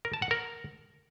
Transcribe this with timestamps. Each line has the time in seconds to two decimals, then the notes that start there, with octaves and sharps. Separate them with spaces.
0.05 A#4
0.14 A5
0.22 F#5
0.31 A#4